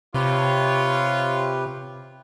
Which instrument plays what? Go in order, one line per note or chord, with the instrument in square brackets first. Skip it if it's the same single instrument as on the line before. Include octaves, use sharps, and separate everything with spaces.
[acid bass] C3 [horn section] F4 C#5 [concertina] G4 B4